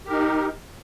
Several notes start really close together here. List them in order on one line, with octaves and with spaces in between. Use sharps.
G4 A#4 D#4